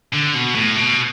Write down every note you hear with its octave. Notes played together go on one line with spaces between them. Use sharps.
D3
B2
A2
B2